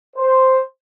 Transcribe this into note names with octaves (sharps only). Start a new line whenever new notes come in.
C5